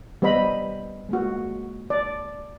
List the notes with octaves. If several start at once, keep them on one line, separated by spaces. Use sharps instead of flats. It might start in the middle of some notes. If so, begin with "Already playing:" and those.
G3 B3 C5 D#5 B5
G#3 A#3 F#4
D5